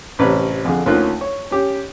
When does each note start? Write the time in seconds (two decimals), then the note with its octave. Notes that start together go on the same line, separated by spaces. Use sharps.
0.19 A1 C3 C4 B4 C#5 A#5
0.65 F2 D3 G#4
0.86 D2 A#3 C#4 D#4 F4 F#6
1.21 C#5
1.51 C#4 G4